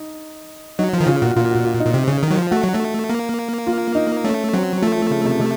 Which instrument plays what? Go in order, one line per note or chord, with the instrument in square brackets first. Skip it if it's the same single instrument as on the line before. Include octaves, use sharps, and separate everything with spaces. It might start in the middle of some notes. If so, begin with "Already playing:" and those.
Already playing: [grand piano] D#4
[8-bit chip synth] F#3 [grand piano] D#4
[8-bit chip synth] F3
D#3
[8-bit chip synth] C#3 [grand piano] F4
[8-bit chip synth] A#2 [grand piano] F#4
[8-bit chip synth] A#2 [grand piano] F4
[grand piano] F#4
F4
D#4
[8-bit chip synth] A#2
C3
C#3
D#3
F#3
F3
[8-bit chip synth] A3 [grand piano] F#4
[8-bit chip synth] F#3
A3
A#3
[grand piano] F4
D#4
[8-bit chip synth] A3 [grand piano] C#4
[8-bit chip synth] F#3 [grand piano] C4
[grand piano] F3 [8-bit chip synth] A3
[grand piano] F3
C#3
C3
C3